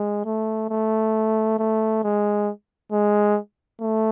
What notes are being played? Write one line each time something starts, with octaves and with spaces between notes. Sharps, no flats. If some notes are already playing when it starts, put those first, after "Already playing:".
Already playing: G#3
A3
A3
A3
G#3
G#3
A3